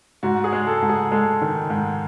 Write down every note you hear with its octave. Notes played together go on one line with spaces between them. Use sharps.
G#2 F#4
G#4
G#3
A4
G#2
G#4
G#3 A4
D#3
G#2